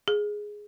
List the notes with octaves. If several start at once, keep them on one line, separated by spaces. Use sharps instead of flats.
G#4